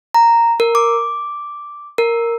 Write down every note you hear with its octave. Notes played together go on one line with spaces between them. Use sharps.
A#5
A#4
D6
A#4